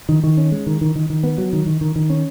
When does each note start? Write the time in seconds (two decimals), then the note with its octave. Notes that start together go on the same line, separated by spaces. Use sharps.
0.09 D#3
0.24 D#3
0.38 C#4
0.52 G#3
0.67 D#3
0.81 D#3
0.96 D#3
1.10 D#3
1.23 B3
1.38 F#3
1.53 D#3
1.66 D#3
1.81 D#3
1.96 D#3
2.10 C#4